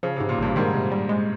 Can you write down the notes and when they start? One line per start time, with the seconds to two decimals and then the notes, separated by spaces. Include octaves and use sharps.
0.03 C#3 F3
0.16 G#2 C3
0.29 A#2
0.38 G#1 G2
0.56 G#2 D#3
0.74 C3
0.92 G3
1.09 G#3